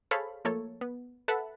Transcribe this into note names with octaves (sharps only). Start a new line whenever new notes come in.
G#4 A4 C5 C#5 F5 B5
F3 A3 A#3 A4 C#5
B3
A4 B4 E5 F#5 A5 B5